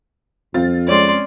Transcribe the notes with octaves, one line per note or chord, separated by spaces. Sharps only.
F2 C4 F4 A6
G#3 C4 C#4 D5 C6